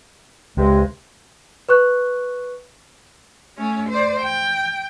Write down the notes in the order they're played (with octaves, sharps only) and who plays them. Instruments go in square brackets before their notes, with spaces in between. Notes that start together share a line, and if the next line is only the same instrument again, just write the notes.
[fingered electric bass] C#2 [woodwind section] G2 C3 G#3
[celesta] B4 C#6 F#6
[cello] A3 C#4
C5 D5
G5